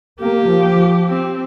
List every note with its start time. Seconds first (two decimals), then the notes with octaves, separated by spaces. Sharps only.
0.19 A#3 G4
0.49 F3
1.08 C4